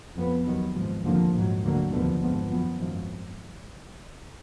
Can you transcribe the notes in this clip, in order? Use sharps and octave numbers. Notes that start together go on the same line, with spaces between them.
F2 F3 B3
D#2 D#3 F#3 B3
G#1 G#2 F3
F1 D#2 D3 F3 A#3
A#1 G#2 F#3
D2 D3 F#3 A#3
F1 D#2 D3 F3 B3
G#1 G#2 F3 B3
G#1 F#2 F3 B3
G#1 F#2 F3